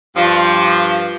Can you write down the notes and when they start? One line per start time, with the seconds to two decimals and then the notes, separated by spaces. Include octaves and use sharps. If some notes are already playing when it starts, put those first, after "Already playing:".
0.16 G2 F3